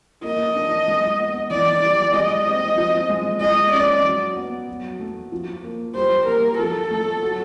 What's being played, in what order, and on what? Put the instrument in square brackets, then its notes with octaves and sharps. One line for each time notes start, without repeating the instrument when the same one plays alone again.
[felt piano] A#3 [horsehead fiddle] D#5
[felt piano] D4
G#3
B3
[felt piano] E3 [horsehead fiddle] D5
[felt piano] G3
[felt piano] G#3 [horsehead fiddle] D#5
[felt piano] C4
F3
G#3
[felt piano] G#3 [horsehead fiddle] D#5
[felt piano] C#4 [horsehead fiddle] D5
[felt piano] F#3
B3
F#3
A3
F3
A#3
[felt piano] G3 [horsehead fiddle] C5
[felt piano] A#3 [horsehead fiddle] A#4
[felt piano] F3 [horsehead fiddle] A4
[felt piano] A3
F#3